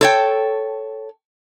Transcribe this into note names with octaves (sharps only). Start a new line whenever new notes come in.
A4 C#5 G5